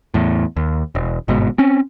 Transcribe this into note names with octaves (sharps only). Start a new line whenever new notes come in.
E2 A2
D#2
E1
G1 G#2 B2
C4 C#4